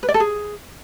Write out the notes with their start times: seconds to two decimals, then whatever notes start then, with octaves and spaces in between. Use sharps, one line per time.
0.03 B4
0.09 D5
0.14 A4
0.20 G#4